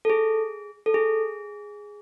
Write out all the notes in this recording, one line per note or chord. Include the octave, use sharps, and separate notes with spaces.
A4
G#4
A4
G#4